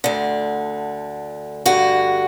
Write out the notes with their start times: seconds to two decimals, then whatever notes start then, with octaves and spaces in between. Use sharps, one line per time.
0.04 D2 D3
1.66 G2 D3 F#4